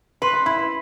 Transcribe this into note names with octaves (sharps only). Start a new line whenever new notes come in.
B4 C6
C6
E4 B5
B5